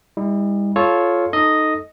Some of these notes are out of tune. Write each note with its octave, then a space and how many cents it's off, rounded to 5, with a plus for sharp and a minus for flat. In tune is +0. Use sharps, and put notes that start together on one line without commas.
G3 +45 E4 -35
F4 +0 A4 -20 C#5 +0
D#4 +0 A4 +0 D#5 +0